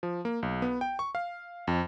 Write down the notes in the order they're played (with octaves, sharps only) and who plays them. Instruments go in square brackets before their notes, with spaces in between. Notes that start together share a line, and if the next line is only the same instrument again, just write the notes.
[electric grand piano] F3
A#3
B1
B3
G5
C#6
F5
F2